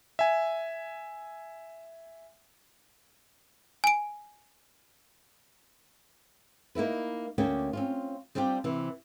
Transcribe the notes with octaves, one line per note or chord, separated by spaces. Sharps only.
E5 G#5
G#5 D7
A#3 D#4 E4 B4
D2 A#3 C#4 G4
C4 C#4 F4
G3 C4 D4 F4 G4
C3 E3